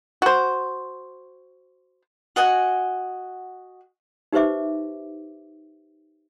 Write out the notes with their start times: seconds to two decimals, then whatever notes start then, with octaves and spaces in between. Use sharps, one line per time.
0.22 F#4 C5
2.36 F#4 D#5 F#5 G#5
4.33 D#4 G4 B4 C5 E5 D6